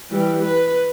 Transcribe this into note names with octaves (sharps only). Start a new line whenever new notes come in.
E3 G3
B4